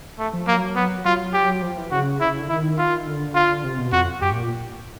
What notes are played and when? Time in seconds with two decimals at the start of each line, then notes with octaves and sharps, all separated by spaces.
0.19 A3
0.34 F3
0.47 F#3 A#3
0.76 B3
1.05 F#3 F4
1.33 G4
1.62 F3
1.77 E3
1.91 C#3 F#4
2.20 E4
2.39 D3
2.49 D#3 E4
2.78 F4
3.07 D3
3.35 F4
3.64 C3
3.79 B2
3.92 F2 F#4
4.21 F#2 G4
4.31 A2
4.36 A#2